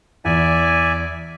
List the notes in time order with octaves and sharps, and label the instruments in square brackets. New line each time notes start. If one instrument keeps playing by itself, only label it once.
[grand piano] E2 [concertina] D5 E5 G#5